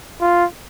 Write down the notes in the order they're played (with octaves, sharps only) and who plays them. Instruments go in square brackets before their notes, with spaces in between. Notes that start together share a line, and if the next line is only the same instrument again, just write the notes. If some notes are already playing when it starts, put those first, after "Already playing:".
[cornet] F4